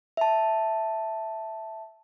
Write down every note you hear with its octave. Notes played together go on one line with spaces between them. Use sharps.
E5 A5